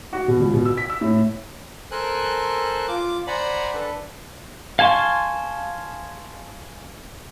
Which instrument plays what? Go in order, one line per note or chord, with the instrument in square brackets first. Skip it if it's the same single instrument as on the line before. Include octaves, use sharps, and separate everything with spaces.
[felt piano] F#4
B2
C#2
B2
E6
B6
E6
A2
[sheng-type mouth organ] A4 A#4 C5 G#5 F#6
F4 D6
C5 D5 F#5 G#5 A#5 B5
D4 A4 B4
[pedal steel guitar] F5 G#5 A5 C6 C#6